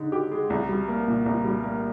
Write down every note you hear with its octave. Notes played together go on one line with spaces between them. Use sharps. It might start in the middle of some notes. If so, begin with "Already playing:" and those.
Already playing: D3 G#3 D#4
G4
G#3
C2
G3
A#3
A#2
C2
G3
A#3